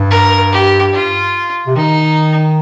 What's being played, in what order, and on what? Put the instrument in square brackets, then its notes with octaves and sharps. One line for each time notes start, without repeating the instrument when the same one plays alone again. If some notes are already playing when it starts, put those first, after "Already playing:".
Already playing: [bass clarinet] G2
[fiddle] A#4
G4
F4
[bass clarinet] C3
[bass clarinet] D#3 [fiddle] D#4